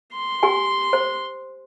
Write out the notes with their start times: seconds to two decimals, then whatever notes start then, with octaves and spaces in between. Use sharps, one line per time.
0.14 C6
0.43 G4 G#5
0.93 C5